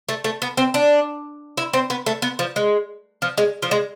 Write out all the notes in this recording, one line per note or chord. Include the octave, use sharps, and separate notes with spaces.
A3
A3
B3
C4
D4
E4
C4
B3
A3
B3
F3
G#3
F3
G#3
F3
G#3